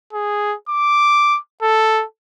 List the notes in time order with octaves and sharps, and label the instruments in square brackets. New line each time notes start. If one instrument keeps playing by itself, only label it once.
[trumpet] G#4
D6
A4